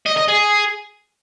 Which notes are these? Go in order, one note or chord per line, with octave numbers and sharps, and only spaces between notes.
D#5
D#5
G#4